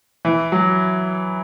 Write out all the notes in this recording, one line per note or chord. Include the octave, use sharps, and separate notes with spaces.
E3
F#3